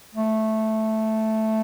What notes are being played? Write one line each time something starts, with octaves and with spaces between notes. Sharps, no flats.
A3